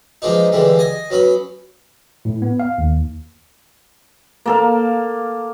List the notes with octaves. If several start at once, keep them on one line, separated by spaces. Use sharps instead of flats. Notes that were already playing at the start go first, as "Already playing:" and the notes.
F3 G#3 B3 D4 D#4
D3 E3 G3 G#3
D#5 G#5
F#3 B3 C#4 B5
A2
B3
F5
D#2
A#3 A4 F5